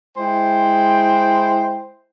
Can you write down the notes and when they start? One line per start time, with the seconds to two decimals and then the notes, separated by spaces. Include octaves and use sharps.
0.17 G#3 E4 C5 G5